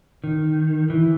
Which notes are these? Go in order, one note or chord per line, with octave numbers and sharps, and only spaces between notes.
D#3
E3